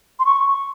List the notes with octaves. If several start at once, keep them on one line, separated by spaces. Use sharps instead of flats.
C6
C#6